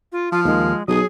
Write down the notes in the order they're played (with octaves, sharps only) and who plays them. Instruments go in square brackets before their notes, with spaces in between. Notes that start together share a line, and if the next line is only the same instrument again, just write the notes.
[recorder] F4
[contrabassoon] F3 [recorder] F4 [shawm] F5
[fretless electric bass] D#2 D#3 [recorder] G#3
[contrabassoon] B1 [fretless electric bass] F#3 [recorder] G#4 [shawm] D#6